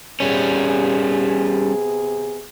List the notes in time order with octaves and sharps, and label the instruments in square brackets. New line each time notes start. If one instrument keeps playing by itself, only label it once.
[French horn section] C3 B3 G#4 [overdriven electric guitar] G3 C#4